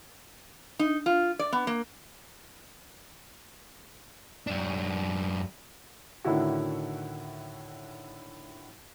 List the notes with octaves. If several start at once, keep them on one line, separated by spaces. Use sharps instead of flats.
D#4
F4
D5
B3
A#3
F#2 D4
A2 D3 D#3 E4 F#4